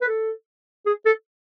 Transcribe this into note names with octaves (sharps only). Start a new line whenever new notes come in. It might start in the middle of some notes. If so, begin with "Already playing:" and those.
B4
A4
G#4
A4